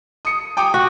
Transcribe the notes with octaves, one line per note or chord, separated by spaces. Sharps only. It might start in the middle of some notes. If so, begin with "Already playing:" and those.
D#6 C#7
G5 D6 D#6
F#4